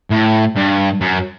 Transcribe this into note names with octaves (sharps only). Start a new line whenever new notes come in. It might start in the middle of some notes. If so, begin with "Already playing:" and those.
A2
G2
F#2